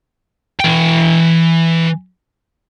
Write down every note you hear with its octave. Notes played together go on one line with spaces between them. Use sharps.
E3 G5